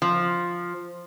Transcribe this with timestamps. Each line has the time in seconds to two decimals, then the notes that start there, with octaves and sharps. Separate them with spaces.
0.02 F3